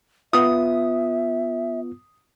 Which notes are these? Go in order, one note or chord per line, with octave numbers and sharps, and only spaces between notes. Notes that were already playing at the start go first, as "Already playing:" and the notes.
B3 F4 E5 D#6